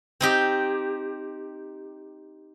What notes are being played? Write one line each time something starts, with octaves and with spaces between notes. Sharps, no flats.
C4 D#4 G4